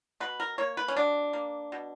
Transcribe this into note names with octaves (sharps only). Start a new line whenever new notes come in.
B2 B4
A#4
A#3 C#5
B4
C#4
B2 D4
A#3
B2